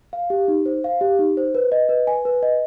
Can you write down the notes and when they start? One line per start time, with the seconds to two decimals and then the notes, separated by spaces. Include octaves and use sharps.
0.13 F5
0.30 G4
0.48 D#4
0.66 C5
0.84 F5
1.01 G4
1.19 D#4
1.37 C5
1.55 B4
1.72 D#5
1.89 B4
2.07 G#5
2.25 B4
2.43 D#5